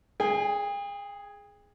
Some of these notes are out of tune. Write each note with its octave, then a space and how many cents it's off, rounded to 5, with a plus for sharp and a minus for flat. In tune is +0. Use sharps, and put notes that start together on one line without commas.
G#4 +5 G5 +45